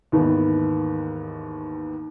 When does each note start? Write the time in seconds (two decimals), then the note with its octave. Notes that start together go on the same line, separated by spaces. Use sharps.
0.12 D#2 G#2 D#3 E3 B3